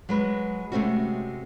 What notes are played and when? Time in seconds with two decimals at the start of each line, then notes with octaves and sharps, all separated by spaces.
0.09 F#3 G#3 B4
0.72 C3 G#3 A3 C4 C#4 F#4